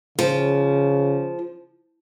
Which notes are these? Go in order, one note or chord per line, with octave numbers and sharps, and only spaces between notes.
C#3 F3